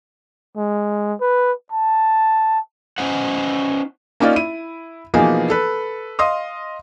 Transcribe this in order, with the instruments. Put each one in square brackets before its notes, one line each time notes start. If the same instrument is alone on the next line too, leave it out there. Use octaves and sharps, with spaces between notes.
[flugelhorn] G#3
B4
A5
[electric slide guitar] C#4 D#4 C5 F#5
[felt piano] A#3 C#4 D#4 F4 D5
E4 D#7
B2 E3 F3 A#3 D#4 G#4
A4 B4
D#5 F5 C6 D#6